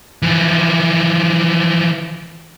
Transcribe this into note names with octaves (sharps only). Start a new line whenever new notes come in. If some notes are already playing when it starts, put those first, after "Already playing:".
E3 F3